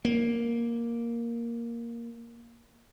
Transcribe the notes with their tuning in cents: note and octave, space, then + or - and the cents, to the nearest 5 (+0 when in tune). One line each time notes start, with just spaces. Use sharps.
A#3 +5